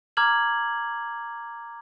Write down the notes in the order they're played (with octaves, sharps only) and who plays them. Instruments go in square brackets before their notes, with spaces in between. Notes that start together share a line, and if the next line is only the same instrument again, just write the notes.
[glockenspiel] A#5 D6 F6 G#6 F#7